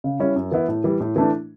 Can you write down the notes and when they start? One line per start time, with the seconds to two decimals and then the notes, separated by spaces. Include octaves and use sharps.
0.04 C#3
0.20 G3 C#4 E4
0.36 F#2
0.52 E3 B3 E4
0.68 A2
0.84 E3 G3
1.00 A2
1.16 E3 A3 D4